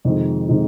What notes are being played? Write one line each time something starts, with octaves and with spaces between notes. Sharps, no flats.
F2 C3 D#3 G#3 D#4
C3 D#3 G#3 D#4